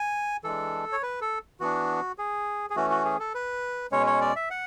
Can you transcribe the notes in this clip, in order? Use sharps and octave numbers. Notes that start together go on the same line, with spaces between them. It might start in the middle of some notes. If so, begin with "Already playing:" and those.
Already playing: G#5
E3 G#3 D4 A4
C#5
B4
A4
E3 B3 D4 F#4
G#4
G#4
E3 A3 C#4 F#4
F#4
G#4
A4
B4
B2 G#3 C#4 C#5
C#5
D5
E5
F#5